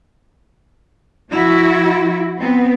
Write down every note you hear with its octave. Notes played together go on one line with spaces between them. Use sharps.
F3 E4 F#4
B3 C4